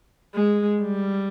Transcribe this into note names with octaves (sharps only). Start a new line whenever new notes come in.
G#3
G3